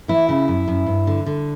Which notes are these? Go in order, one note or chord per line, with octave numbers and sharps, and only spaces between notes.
E3 E4
C#3
F#2
F#2
G2
D3
D3